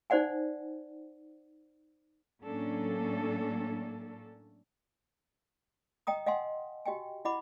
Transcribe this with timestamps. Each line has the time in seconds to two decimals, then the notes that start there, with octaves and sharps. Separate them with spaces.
0.10 D#4 C5 D5 F#5 G#5
2.44 A2 F#3 A#3 C#4 D4 A4
6.07 D#5 G5 A#5 D#6
6.27 D#5 F5 F#5 G#5 C6
6.86 F#4 G4 D#5 G5 G#5
7.25 E4 D#5 F#5 B5 D6